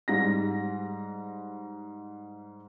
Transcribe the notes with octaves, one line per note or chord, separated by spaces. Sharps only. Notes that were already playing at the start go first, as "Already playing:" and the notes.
G#2 G3 A#6